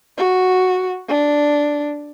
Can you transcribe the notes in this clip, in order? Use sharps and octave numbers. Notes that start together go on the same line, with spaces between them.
F#4
D4